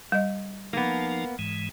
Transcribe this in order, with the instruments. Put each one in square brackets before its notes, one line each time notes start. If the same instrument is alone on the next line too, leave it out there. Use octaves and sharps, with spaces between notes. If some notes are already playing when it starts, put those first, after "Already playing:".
[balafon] G3 D#5
[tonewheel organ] F3 D#4 A5 [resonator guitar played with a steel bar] A#3 B3
[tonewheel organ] G#2 E3 G#3